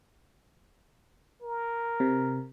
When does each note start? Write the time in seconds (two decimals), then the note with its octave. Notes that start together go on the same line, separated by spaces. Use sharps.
1.42 A#4
2.00 C3